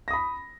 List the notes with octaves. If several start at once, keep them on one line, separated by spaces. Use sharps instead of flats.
B5 D#6 A#6